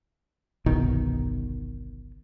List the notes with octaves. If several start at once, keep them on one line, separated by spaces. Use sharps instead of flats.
G1 C2 B2 D#3